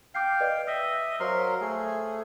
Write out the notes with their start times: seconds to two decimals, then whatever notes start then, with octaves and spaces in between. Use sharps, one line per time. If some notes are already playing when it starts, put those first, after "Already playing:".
0.15 F5 G5 D6 G6 C7
0.40 B4 D5 D#5
0.67 D#5 E5 E6
1.20 F#3 A#4 C5 F5 C6
1.61 A3 G#4